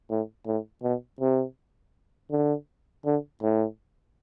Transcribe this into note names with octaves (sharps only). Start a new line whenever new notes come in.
A2
A2
B2
C3
D3
D3
A2